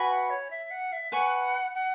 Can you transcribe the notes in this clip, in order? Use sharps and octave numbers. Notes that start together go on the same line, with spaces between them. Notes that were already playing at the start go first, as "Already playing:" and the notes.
Already playing: F#4 B4 G#5 B5
F#5
C#5
E5
F#5
E5
B4 F#5 G#5 C#6
F#5